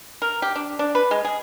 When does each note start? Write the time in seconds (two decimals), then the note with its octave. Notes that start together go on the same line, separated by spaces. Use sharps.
0.22 A#4
0.42 G4
0.55 D4
0.79 D4
0.95 B4
1.11 G#3
1.25 G#4